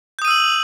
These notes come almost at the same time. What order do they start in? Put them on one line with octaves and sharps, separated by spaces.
G6 D#6 D#7 E6 F#7